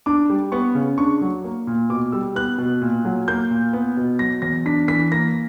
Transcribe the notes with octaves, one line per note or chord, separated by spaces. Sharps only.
D4 D6
G3
B3 C#6
C#3
D4 C#6
F#3
A#3
A#2
B2 D6
G3 E6
B3 F#6
B2
A#2
F#3
A#3 G6
A#2
B3
B2
F#3 A#6
E2 A#6
D4 B6
E3 B6
A#3 A#6